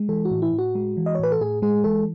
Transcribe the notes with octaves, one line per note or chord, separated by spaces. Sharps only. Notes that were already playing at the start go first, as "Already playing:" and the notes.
Already playing: G#3
E3 A4
F#4
A2
E4
A2
F#4
G#3
E3
D#5
C#5
A2 B4
A4
A2 G#4
G#3 G#4
E3 A4